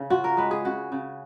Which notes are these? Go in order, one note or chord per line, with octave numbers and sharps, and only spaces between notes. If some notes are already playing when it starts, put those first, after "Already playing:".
Already playing: C#3
F4 F#4
A#4
G#3 B4
G#4
C#3 F#4
C#3